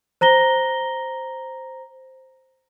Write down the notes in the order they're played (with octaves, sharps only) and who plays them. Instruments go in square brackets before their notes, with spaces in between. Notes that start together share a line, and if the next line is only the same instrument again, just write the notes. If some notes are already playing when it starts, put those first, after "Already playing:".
[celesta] C5 A#5 A#6 G7